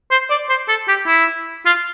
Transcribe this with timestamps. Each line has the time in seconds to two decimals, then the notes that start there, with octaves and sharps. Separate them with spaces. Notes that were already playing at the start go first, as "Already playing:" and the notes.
0.11 C5
0.30 D5
0.49 C5
0.68 A4
0.88 G4
1.07 E4
1.66 F4